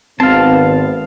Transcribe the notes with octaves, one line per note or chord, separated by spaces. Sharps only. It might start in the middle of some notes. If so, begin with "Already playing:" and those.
G#1 G#2 B3 C4 F5 A5